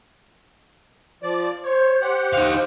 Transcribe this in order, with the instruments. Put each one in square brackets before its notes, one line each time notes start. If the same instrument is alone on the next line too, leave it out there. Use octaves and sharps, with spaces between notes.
[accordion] F3 D5
[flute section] C5 [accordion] C#5
[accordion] G4 F#5 [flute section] C5
[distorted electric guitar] D#4 F5